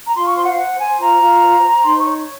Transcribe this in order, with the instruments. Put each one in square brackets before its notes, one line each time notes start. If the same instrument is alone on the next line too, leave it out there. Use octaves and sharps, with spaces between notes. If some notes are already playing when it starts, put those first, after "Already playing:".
[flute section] A#5
F4 C6
C#6
C5 C6
F#5
F5
C5 F#5
C5 G#5
F4 A#5
F4
C5
C5
D#4 C6
C#6
C#5